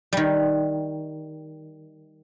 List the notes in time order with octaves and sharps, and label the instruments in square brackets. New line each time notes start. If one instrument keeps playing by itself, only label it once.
[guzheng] D#3 G3